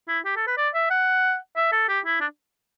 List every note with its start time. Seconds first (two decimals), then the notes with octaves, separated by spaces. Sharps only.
0.08 E4
0.25 G4
0.36 A4
0.47 B4
0.57 D5
0.74 E5
0.90 F#5
1.56 E5
1.72 A4
1.88 G4
2.05 E4
2.21 D4